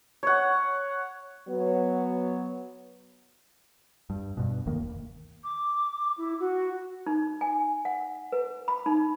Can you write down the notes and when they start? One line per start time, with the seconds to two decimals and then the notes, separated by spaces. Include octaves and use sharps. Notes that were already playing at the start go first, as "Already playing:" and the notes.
0.23 C#5 F#5
1.49 F#3 B3
4.10 G2
4.37 G2 B2
4.66 F1 D2 D#3 A#3
5.43 D6
6.17 E4
6.39 F#4
7.06 D#4
7.41 G#5
7.85 F#5
8.32 B4
8.68 B5
8.86 D#4